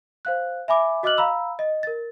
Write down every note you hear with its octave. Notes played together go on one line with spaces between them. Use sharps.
C5 F5 F#6
E5 G#5 B5 D6
F#4 D#5 D6 F6 F#6 F#7
F5 A#5 B5 E6
D#5
A#4 A6